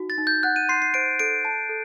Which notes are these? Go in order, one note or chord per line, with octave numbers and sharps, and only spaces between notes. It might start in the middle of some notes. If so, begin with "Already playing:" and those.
Already playing: D#4 F#4
A6
D#4
G6
F#5 F#6
D#7
C6 C7
C7
C5 D7
A4 D7
A5
A4